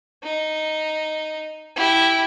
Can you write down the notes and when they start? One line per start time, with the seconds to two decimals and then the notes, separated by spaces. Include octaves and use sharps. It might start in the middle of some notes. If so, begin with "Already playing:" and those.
0.23 D#4
1.76 E4 G4